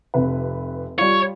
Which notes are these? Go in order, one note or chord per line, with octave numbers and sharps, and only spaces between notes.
F1 C3 B4
G3 F4 C#5